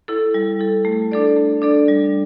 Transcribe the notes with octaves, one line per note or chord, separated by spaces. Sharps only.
E4 A4
G3
E4 A4
A3
D4 A4 D5
A3
D4 A4 D5
G3